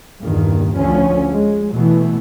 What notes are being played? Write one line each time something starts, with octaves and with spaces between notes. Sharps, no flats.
E2 G2 A#2 D#3
D2 D3 F3 C#4
G#3
B2 E3 A3